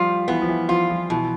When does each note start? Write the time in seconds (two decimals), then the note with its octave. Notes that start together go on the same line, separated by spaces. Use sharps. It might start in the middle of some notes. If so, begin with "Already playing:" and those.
Already playing: F3 G3 F4
0.28 E3 B3
0.41 F3
0.49 E3
0.69 F3 F4
0.90 F3
1.10 B2 E3